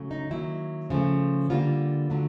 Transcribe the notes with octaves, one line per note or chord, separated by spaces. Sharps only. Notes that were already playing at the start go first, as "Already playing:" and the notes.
Already playing: C#3 F#3 A3
D#4
D#3 F#3 A#3 E4
C#3 F3 A3
D3 G3 A#3 F4
D3 F#3 A3